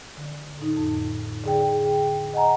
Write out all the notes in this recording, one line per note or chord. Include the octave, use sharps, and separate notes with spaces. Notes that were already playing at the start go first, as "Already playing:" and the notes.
D3
A2 D#4
F2
D3 G#4 G5
D#5 F#5 G#5 A#5